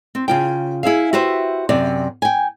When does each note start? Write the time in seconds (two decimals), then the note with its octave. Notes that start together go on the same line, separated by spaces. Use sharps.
0.15 C4
0.28 C#3 F4 G5
0.83 E4 G#4 E5 F5
1.13 F#4 G4 B4 C5 E5
1.69 F#2 C3 D5
2.22 G5 G#5